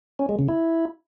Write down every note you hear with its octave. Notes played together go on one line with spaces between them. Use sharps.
C#4
G#3
C#3
E4